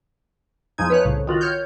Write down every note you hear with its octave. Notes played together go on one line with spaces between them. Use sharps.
E2 F3 G#3 D#4 G#6
B4 C#5 F#6
C2 A2 C#3
D#3 F4 F#4
C#5 F6 G6